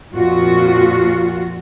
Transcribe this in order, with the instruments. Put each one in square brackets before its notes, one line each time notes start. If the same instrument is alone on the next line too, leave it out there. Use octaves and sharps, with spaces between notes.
[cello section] F2 A#2 F4 F#4